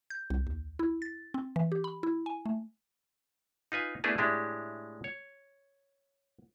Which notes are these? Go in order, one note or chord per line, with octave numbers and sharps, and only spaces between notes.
G6
C2
D#2
E4
A6
C4
E3
G4
B5
E4
G#5
A3
D#4 F4 B4 G#5
A3 B3 D4 E4 G#4 B4
A2 G#3 D4 E4 G4
C#5